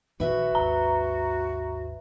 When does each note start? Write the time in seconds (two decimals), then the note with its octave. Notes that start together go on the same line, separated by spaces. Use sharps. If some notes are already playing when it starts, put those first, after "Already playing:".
0.20 A#1 D#3 F#4 B4 E5
0.55 G#1 D#2 A#5